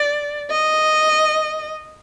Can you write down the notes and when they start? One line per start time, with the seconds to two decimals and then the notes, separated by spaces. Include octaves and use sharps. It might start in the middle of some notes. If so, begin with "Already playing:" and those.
Already playing: D5
0.51 D#5